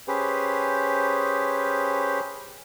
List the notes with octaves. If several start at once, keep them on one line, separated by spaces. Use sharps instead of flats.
C#4 G4 G#4 B4 C5